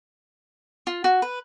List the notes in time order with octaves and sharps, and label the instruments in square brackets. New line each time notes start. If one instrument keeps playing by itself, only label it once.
[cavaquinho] F4
F#4
B4